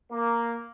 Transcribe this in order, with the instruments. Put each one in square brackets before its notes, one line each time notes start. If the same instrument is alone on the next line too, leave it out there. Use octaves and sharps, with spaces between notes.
[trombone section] A#3